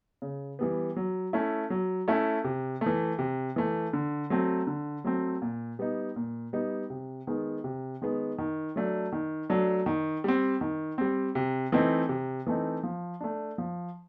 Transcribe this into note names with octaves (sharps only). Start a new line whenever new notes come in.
C#3
E3 G3 B3
F#3
A3 C#4 E4
F#3
A3 C#4 E4
C3
E3 A3
C3
E3 A3
D3
F#3 A3 C4
D3
F#3 A3 C4
A#2
G3 B3 D#4
A#2
G3 B3 D#4
C3
D#3 G#3 B3
C3
D#3 G#3 B3
D#3
F#3 A3 D4
D#3
F#3 A3 D4
D#3
G3 C4
D#3
G3 C4
C3
E3 A3 C4 D#4
C3
E3 A3 C4 D#4
F3
A3 D4
F3